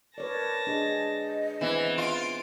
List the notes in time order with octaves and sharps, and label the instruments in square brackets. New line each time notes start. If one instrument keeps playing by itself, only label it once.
[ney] A#4 [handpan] B4 C#5 D5 [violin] A5 A#6
[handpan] D4 G#4 [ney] D#5
[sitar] E3 [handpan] B3 C4 B4 [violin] E7
[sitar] F4 [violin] D7